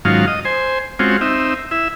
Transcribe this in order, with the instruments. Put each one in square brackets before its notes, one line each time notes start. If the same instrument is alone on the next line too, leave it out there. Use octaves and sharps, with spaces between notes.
[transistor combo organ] G#2 D#3 F#3 C#4 F4 F5
D#5
C5 G#5
G#3 C4 C#4 F4 F#4
C4 D#4 E5
E4 E5